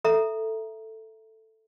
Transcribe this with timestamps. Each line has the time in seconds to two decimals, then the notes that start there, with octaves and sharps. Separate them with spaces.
0.04 A4 E5 A#5